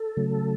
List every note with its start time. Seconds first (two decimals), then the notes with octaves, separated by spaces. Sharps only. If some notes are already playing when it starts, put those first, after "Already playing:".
Already playing: A4
0.17 C#3 F#3 A3